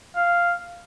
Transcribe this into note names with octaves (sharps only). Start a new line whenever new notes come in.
F5